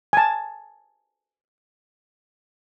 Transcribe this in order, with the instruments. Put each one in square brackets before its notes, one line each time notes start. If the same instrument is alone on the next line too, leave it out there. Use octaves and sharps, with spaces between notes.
[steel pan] G#5 A5